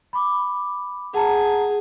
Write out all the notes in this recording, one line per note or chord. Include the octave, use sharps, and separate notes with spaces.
B5 D6
G#4 F#5 A5 A#5